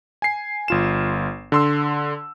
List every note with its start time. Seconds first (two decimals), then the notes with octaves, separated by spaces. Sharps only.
0.22 G#5 C7
0.68 G1 F4 E7
1.52 D3 C6 E6